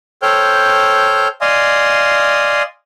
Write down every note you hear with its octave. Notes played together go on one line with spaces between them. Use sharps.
A4 C5 C#5 G5 F6 G6
D5 D#5 F5 G#5 C6 D#6